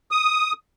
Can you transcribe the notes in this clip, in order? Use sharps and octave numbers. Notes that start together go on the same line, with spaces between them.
D#6